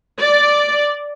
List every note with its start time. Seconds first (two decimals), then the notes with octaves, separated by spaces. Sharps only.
0.20 D5